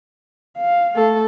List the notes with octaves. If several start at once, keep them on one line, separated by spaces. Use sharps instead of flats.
F5
A3 A4